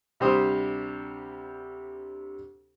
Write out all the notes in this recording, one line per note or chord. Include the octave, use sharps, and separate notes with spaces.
D2 C3 G3 G4 C5 D#6